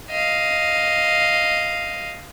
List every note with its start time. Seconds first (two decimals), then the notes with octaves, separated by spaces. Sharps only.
0.11 D#5 F5